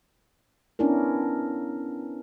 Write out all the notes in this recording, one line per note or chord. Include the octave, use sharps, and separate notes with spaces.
B3 C#4 D4 E4 A#4